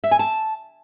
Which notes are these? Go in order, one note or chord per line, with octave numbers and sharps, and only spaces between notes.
E5
G#5
A5